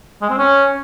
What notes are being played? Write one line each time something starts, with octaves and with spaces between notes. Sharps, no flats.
G#3
C4
C#4